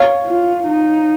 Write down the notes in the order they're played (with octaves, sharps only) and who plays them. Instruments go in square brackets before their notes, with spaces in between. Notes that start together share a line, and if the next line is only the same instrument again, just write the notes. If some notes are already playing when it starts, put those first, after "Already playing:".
Already playing: [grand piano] C#5 F5
[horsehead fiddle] F4
D#4